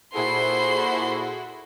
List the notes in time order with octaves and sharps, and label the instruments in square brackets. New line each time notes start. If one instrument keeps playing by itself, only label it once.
[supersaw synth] A#2 G#4 A4 [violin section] E4 F#4 [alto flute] C5 [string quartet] C6